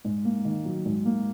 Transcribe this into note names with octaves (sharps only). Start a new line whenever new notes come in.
G#2
A#3
D#3
F#3
G#2
A#3